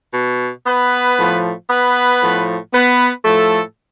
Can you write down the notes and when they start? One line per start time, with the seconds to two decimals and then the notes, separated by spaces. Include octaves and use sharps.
0.13 B2
0.65 B3 B4
1.17 A2 F3
1.68 B3 B4
2.20 A2 F3
2.72 B3 B4
3.24 A2 F3 A3 A4